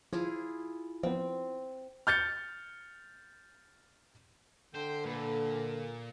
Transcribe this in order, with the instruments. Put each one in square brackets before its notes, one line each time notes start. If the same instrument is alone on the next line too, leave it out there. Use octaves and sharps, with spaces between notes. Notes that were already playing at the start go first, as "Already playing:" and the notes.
[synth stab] F3 [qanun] E4 F4 G#4
[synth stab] F3 B3 [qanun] C4
[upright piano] F6 G6 A6 C#7
[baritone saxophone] D3 [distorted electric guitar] C5 [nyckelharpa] G5
[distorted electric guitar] A#2 [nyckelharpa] A4 B4
[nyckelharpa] A#4